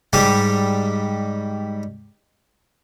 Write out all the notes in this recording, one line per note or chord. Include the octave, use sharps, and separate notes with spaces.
G#2 G3 G4